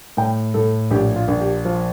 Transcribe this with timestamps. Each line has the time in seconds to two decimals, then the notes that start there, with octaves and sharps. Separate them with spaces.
0.17 A2 G5
0.54 A2 A4
0.91 A#1 G4
1.16 F4
1.28 A#1
1.41 G4
1.65 F3 F4